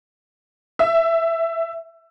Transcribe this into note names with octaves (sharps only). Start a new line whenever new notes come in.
E5